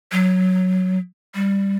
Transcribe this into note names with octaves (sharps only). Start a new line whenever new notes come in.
F#3
G3